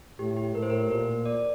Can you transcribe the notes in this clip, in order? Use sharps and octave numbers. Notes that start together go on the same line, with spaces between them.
A2 G4
G4
A2 A#4
C5
A#4
A#2 A#4
D5